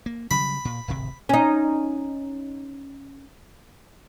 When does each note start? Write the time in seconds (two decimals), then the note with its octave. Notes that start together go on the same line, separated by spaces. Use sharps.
0.06 A#3
0.31 C#3 F#3 G3 B5
0.65 A#2
0.88 D1 G#1 C3
1.29 C#4 D#4